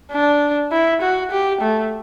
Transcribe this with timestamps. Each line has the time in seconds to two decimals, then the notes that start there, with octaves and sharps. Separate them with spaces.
0.12 D4
0.72 E4
1.02 F#4
1.31 G4
1.61 A3